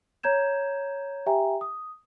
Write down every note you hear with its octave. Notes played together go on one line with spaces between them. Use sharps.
C#5 A#5 G6 G#6 E7
G4 E5 G5 G#5 A#5
D#6